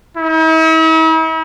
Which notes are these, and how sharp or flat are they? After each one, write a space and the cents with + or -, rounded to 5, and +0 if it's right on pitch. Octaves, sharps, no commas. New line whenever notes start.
E4 -45